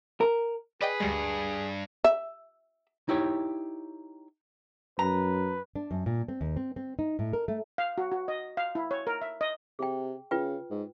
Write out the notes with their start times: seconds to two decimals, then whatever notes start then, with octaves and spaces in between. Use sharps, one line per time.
0.21 A#4
0.81 G#4 B4 D5 D#5 G5
1.00 D2 G2 G3 G#3
2.04 E5
3.09 D#4 E4 G4 C#5
4.99 F#2 B4 A#5
5.76 D4
5.91 F#2
6.06 A#2
6.28 C4
6.41 D#2
6.56 C4
6.76 C4
6.99 D#4
7.19 A2
7.33 A#4
7.48 A3
7.78 F5
7.98 F#4
8.12 F#4
8.28 D#5
8.57 F5
8.75 E4
8.91 C#5
9.07 A#4
9.22 E5
9.41 D#5
9.79 C3 G#4 G5
10.31 C#3 F4 B4 G5
10.70 G#2